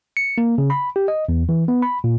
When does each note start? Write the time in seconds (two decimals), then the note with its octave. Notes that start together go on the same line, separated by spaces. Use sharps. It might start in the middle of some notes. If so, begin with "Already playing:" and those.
0.17 C#7
0.38 A#3
0.58 C#3
0.70 B5
0.96 G4
1.08 D#5
1.29 E2
1.49 E3
1.68 B3
1.82 B5
2.04 A#2